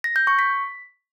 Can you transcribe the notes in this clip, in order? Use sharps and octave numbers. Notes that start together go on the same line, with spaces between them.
A#6
G6
C#6
B6